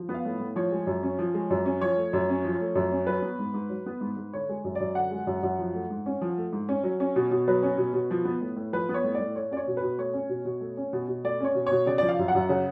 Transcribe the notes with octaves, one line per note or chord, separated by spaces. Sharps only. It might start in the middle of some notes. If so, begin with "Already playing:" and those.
Already playing: F3
B3
F5
A2
A2
F3 C#5
G#3
F#2
C#4
F3
G#3
F#2
C#4
F3 C#5
A3
F#2
C#4
F3
A3
F#2
C#4
F#3 B4
B3
G#2
G#2
F#3
B3
G#2
G#2
D3 C#5
G#3
F#2
F#2 D5
D3 F#5
G#3
F#2
F#2
F3
A3
G#2
C#4
F3
A3
G#2
C#4
F#3
C#4
B2
B2
F#3 B4
C#4
B2
B2
F3
B3
A2
A2
F3 B4
B3
C#5
A2
D5
A2
A3 C#5
C#4 D5
C#5
B2
B4
B2
A3 C#5
C#4
B2
B2
A3
C#4
B2
B2
A3 D5
C#4 C#5
B2
B2 C#5
C#3 D5
F3 D5
F5
F#2
F#5
F#2
C#3